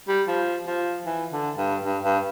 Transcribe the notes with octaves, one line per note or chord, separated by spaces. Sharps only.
G3
F3
F3
E3
D3
G2
G2
G2